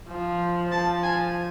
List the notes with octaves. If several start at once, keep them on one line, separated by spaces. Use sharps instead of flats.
F3
F3 A5
G#5